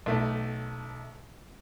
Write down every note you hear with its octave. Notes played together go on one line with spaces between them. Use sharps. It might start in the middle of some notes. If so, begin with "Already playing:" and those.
B1 A3